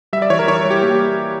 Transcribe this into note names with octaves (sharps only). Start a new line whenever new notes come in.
G3 E5
D5
E3 C#5
A#4
E3 C#5
G3
G4
A#3 G4